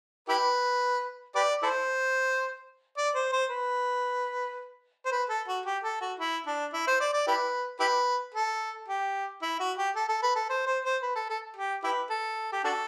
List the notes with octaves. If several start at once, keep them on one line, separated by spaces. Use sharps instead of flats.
E4 G4 B4
G4 B4 D5
E4 A4 C5
D5
C5
C5
B4
C5
B4
A4
F#4
G4
A4
F#4
E4
D4
E4
C5
D5
D5
E4 G4 B4
E4 G4 B4
A4
G4
E4
F#4
G4
A4
A4
B4
A4
C5
C5
C5
B4
A4
A4
G4
E4 G4 B4
A4
G4
D4 F#4 A4